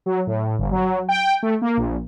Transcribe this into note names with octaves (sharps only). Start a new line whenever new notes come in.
F#3
A2
G1
F#3
G5
A3
A#3
A#1